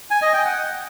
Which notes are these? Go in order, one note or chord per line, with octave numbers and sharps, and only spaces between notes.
G#5
D#5
G5
F#5